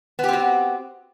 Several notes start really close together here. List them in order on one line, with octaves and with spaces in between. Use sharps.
B3 G4 C4 F#4